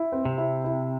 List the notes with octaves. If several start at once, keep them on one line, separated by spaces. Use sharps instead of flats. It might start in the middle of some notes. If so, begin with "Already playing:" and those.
Already playing: E4
C4
C3
E4
E4